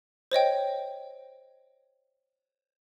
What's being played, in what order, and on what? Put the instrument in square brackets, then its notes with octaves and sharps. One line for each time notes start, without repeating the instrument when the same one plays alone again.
[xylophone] C5 C#5 D#5 G5